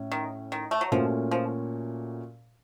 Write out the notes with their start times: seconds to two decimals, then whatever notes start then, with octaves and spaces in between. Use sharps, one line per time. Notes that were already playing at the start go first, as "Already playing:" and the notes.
Already playing: A2 C#4
0.12 D#3
0.52 D#3
0.71 A3
0.81 F#3
0.92 A#2 F3 A3 C#4 F#4
1.31 F3